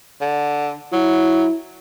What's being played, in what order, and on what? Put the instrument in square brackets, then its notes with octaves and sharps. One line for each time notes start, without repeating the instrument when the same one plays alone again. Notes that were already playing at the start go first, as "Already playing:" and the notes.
[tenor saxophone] D3
[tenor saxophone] F#3 [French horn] E4